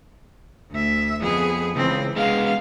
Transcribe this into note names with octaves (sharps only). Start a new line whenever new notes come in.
D2 E5
F2 B3 G#4
C#2 E3 C4
G#3 B3 F5